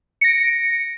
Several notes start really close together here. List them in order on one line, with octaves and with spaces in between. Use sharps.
C#7 A#6 D7